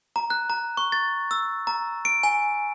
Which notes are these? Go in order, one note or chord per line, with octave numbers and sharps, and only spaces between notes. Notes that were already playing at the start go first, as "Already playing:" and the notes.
A#5
F#6
A#5
C#6
A6
E6
A#5
D7
G#5